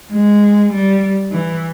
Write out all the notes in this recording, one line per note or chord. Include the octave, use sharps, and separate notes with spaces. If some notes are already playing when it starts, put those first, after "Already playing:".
G#3
G3
E3